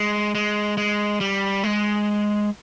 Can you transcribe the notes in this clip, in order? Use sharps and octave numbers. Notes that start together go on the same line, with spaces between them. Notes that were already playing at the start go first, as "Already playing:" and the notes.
Already playing: G#3
G#3
G#3
G3
G#3